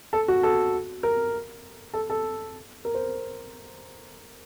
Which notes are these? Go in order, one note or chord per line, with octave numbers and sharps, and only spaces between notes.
A4
F#4
A4
A#4
A4
A4
A#4
C5